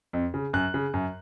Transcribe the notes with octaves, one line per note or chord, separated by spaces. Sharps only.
F2
C#3
F#2 F#6
C#3
F#2